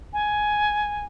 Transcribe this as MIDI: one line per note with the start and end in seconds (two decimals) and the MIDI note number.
0.13 1.05 80